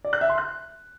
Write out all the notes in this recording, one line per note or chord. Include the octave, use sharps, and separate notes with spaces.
D5
F#6
E5
C6
F#6